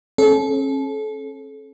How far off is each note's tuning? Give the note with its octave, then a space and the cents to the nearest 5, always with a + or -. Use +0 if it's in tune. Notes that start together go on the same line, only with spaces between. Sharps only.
C#4 -40 A4 -35